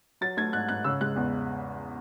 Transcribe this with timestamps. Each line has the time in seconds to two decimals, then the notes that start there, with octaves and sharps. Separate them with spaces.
0.21 F#3 A6
0.37 A3 G#6
0.53 G#2 F#6
0.69 G#2 F#6
0.84 C#3 E6
1.01 G#3 F#6
1.16 E2